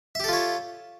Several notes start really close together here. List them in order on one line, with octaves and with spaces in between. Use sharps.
E5 G4 A4 F4 C#5